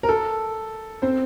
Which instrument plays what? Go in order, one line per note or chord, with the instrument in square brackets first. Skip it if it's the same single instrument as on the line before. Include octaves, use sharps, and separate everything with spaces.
[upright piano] A#4
A4
C4 C5